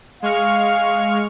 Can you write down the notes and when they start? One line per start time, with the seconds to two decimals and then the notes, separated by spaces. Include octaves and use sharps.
0.22 G#3 F5 C#6 F6